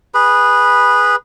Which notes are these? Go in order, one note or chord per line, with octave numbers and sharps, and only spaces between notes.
G#4 B4 B5